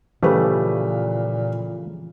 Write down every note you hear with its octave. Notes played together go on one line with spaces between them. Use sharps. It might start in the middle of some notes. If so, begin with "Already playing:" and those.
A#2 C#3 E3 F3 G3 A3 G4 B4